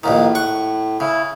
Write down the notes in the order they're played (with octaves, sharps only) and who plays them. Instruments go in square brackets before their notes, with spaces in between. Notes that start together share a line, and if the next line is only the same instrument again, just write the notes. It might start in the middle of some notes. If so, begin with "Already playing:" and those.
[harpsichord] A#1 D#2 D#3 [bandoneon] A2
[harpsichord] F#5 C#6
[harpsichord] C#3 [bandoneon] E4